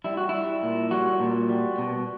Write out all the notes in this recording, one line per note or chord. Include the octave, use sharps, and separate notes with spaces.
G3 E4
F#4
G3 E4
A#2
G3 F#4
A#2
G3
B2